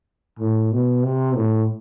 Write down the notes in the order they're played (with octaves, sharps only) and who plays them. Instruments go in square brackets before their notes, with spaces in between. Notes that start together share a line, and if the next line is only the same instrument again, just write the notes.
[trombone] A2
B2
C3
A2